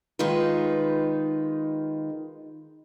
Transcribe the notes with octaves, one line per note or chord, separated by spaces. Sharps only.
D#3 G#3 D#4 F4 B4